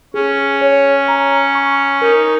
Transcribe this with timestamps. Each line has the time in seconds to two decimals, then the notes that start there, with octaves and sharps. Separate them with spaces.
0.14 C#4 G#4
0.61 C#5
1.08 A#5
1.55 C#6
2.01 D#4 A#4